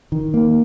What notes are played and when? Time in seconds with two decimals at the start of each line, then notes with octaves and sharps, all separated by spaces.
0.12 D#3
0.34 A#3